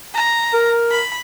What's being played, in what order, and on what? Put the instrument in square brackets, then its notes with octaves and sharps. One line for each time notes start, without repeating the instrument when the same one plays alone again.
[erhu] A#5
[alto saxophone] A#4
[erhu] B5